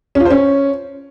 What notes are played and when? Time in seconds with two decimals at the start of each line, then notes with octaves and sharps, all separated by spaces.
0.15 C#4
0.20 F4
0.25 C5
0.30 C#4